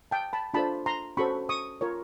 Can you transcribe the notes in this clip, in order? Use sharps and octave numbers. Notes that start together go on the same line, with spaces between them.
G5 A5
A5 B5
D4 F4 A4 C5 A5 B5
A#5 C6
C#4 F#4 A4 C5 B5 C#6
C#6 D#6
F4 A#4 C#5